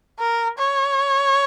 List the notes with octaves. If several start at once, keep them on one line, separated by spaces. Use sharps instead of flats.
A#4
C#5